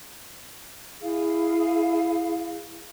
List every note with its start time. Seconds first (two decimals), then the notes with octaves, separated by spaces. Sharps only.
1.02 E4 G#4 F5